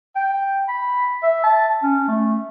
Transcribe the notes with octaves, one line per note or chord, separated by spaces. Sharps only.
G5
B5
E5
A5
C#4
A3